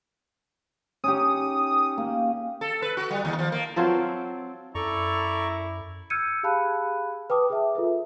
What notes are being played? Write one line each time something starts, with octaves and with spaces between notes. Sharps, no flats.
C#4 D#4 G4 D#6
A#3
A4
B4
F#4
G3
D#2
F3
A#3
F#3 C4 F4 A4
F#2 E4 A4 D5 A#5 C#6
E6 F6 G6 G#6 C#7 D#7
G4 G#4 F5 A5 B5 F#6
B4 G5 A5 D6 D#6
G#4 E5 A5
F4 A4 B4 E5